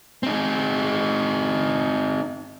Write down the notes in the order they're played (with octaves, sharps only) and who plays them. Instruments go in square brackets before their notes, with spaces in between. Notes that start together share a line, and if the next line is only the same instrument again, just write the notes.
[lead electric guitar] C4 D#4